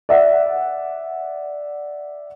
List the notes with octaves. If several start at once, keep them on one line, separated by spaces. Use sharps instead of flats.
D5 E5 F#5